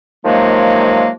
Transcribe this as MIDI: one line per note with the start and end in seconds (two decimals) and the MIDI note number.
0.24 1.08 48
0.24 1.08 51
0.24 1.08 53
0.24 1.08 54
0.24 1.08 56
0.24 1.08 58